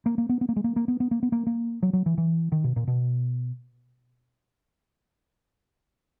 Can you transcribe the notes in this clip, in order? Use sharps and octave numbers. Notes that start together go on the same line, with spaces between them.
A#3
A#3
B3
B3
A#3
G#3
A#3
A#3
B3
B3
A#3
B3
A#3
A#3
F#3
F#3
E3
E3
D#3
B2
A#2
B2